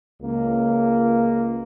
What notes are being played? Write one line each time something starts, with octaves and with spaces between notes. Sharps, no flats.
C#2 A#3